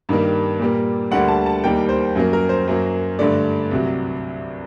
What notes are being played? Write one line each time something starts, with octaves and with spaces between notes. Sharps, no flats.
G2 D#3 G3 A#3
A#2 G3 A#3
D2 D3 G3 A#3 F#5
A5
A5
D#2 D#3 G3 A#3 G5
C5
F#2 F#3 A#3
A#4
C5
F#2 F#3 A#3
G2 D3 A3 D5
C2 C3 F#3